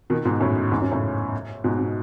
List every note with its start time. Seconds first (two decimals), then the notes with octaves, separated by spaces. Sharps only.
0.10 B2 D#3
0.25 G#2 B2
0.40 F#2 A2
0.72 E2 G#2
0.81 F#2
0.92 A2 C#3
1.64 G#2 B2
1.79 B2